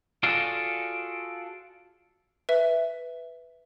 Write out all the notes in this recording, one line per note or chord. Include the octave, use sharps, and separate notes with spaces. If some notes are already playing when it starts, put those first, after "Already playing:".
F4 F#4 G#4 A4 D5 F5
B4 E5